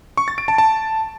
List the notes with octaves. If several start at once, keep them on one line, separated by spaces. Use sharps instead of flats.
C#6
A6
D7
A5
A5